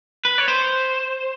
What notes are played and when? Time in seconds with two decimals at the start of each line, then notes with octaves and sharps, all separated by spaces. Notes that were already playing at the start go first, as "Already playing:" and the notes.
0.25 B4
0.38 C#5
0.48 C5